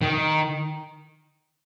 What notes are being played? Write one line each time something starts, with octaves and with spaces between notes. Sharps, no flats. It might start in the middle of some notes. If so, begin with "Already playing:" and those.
D#3